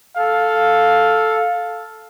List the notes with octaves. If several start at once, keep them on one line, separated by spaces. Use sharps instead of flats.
A4 F5